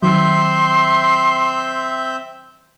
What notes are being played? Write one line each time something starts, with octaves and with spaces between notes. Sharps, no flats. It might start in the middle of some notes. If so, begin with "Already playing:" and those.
D#3 F#3 C4 E5 C6 G6